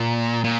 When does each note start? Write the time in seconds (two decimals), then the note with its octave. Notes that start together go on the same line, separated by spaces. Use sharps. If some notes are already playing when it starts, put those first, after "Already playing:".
Already playing: A#2
0.44 A#2